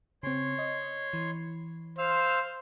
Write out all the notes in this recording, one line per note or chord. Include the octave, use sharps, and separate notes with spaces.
C#3 C4 C#5 C6
D#5
E3
C5 F5 E6 F6